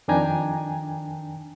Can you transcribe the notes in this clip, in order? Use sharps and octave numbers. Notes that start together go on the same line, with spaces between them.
F2 D#3 D4 G5 G#5 A#5